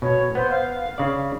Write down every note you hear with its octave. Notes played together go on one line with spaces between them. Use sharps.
B2 C#5
B3 C5
F5
C#3 D5